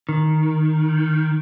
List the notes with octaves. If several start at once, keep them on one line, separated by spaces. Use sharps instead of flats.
D#3